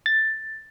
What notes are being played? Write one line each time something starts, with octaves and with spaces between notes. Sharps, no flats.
A6